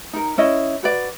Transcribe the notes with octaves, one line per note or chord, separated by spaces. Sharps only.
D#4 A#4
C#4 E4 D#5
F#4 B4 D5